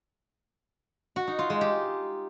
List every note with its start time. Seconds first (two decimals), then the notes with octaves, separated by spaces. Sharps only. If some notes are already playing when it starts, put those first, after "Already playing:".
1.16 F#4
1.27 D#4
1.39 F4
1.50 G#3
1.61 G4